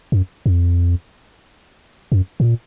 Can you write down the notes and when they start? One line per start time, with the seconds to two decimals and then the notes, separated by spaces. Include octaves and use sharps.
0.12 F#2
0.46 F2
2.12 F#2
2.40 G#2
2.44 A#2